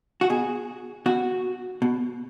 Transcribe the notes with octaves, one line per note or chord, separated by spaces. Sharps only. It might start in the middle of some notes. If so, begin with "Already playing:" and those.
F#4
B2 G#4
B2 F#4
B2